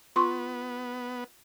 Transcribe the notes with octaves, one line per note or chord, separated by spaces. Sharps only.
B3 F4 C6 C#6